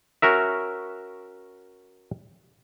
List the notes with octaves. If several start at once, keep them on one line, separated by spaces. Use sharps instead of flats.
C#4 F#4 A#4 E5